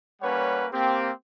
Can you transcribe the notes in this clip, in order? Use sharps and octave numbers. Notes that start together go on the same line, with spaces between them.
G3 A#3 C#4 B4 C#5 F#5
A#3 C4 G4